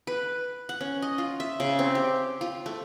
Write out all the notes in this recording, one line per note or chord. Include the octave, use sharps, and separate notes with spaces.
B4
F#5
C#4
D#5
F4
E5
C#3
C4
G4
F4
A3